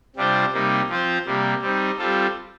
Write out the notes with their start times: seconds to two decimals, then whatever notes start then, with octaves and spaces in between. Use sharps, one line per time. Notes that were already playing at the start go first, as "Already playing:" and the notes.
0.16 C3 G3 D4 F4 C5
0.53 C3 G3 A#3 D#4
0.89 F3 C4 F4 C5
1.25 C3 G3 A#3
1.62 G3 C4 D#4
1.98 G3 C4 F4 A4